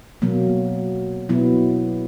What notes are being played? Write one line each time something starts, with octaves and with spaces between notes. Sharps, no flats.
B2 F#3 A#3
B2 F#3 B3 E4